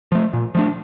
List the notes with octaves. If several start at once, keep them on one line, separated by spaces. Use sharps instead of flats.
F3 A3
A#2
F3 A3 D4